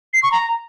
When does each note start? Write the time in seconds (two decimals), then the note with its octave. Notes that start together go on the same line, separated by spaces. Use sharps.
0.14 C7
0.23 C#6
0.32 A#5